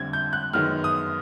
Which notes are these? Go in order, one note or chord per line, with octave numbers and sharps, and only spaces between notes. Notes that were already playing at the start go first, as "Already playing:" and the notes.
Already playing: F2 D3 G3 C4 G#6
G6
F#6
F#2 D#3 G#3 B3 F6
D#6